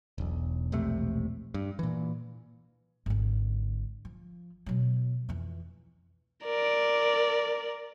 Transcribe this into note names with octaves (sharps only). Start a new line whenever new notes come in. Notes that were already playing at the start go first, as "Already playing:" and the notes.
E1 B1
E1 A#1 C3 A3
G2
A#2 E3
G#1 D3
F3
B2 F#3
F2 E3
A#4 D5